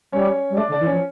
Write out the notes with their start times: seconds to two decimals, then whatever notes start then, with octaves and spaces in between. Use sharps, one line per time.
0.12 G3 C#4 C#5
0.49 G3
0.56 A3 D4 D5
0.68 D3
0.72 D4 D5
0.79 E3
0.86 F3 C#4 C#5